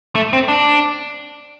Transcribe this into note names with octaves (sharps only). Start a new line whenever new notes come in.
A3
C4
D4